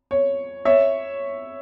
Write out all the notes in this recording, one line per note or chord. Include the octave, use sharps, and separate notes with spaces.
C#5
C#5 E5